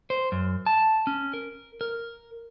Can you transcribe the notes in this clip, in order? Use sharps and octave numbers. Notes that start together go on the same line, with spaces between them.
C5
F#2
A5
C#4
A#4
A#4